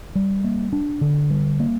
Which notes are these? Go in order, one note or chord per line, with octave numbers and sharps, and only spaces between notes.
G3
A#3
D4
D3
G3
A#3